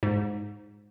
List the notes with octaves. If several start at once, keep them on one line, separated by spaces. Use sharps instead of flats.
G#2